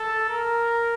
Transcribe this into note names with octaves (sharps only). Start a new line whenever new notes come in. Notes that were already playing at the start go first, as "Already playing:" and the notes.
Already playing: A4
A#4